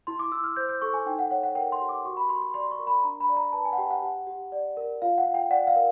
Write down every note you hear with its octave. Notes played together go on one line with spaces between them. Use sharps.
E4 C6
D6
E4 E6
F6
C5 G6
G6
A4 C#6
G#5
D#4 G5
F#5
C#5 F#5
F#5
A#4 G5
C6
G4
D6
F#4 C#6
B5
F#4 C6
C6
D5 C6
C6
C#6
A#4
B5
D4 A#5
B5
D5
A#5
B4 A5
G#5
F#5
G4 G5
F#5
G4
G4
D5
A#4
F4 F5
F#5
F4
G5
D5 F#5
F5
A#4